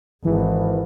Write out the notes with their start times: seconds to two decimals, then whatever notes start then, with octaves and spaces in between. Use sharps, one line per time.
0.25 G#1 E3